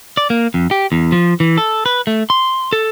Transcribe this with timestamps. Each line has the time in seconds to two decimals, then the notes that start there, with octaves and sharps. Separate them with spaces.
0.17 D5
0.30 A#3
0.54 F2
0.71 G4
0.92 E2
1.12 F3
1.40 E3
1.58 A4
1.86 B4
2.07 A3
2.30 C6
2.73 A4